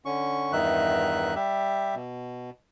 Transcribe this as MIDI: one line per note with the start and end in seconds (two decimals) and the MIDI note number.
0.05 0.53 50
0.05 0.53 61
0.05 0.53 85
0.53 1.35 40
0.53 1.35 43
0.53 1.35 51
0.53 1.35 63
0.53 1.35 76
0.53 1.35 90
1.36 1.95 55
1.36 1.95 67
1.36 1.95 76
1.95 2.50 47